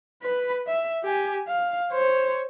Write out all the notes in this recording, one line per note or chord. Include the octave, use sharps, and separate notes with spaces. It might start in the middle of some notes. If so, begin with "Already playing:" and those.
B4 B5
E5
G4 G#5
F5
C5 C#5